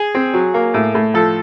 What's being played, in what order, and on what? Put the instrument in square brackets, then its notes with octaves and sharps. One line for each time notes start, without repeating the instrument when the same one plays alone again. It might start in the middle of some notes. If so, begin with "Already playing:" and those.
Already playing: [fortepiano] G#4
C4
F#3
A#3
A2
A2
F3 A4